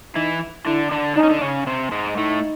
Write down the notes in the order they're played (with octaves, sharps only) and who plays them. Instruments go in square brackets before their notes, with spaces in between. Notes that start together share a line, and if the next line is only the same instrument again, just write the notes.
[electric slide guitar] E3 E4 [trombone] D#4
[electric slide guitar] D3 D4 [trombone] E4
[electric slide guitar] D3 D4
[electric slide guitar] D4 [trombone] D#4
[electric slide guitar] C#4
D3 D4
C#3 C#4
C3 C4
G#2 G#3
[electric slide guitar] A2 A3 [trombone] D#4